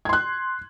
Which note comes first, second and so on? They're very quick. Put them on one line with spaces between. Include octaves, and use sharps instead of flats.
G#6 C6 F#6